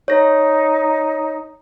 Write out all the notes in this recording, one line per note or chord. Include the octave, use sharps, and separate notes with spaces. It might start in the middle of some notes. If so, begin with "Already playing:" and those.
D#4 C#5 A#6